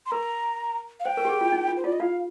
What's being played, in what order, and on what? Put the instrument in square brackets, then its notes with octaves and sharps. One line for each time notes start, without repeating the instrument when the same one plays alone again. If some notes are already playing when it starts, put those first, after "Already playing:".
[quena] C6
[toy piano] A#4 [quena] A#5
[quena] F5
[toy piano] C5 [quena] G5
[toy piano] A#4
G4
G#4
F4
D#4
F4
[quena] C5
[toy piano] F4 [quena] D5
[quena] D#5
[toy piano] F4 [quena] F5